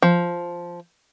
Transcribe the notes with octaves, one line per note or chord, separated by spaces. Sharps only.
F3